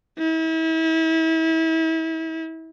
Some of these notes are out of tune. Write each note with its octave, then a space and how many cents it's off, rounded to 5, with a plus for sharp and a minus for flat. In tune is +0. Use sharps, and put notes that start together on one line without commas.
E4 -35